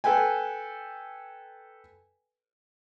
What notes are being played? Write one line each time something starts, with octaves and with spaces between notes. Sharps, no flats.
A4 B4 G5 G#5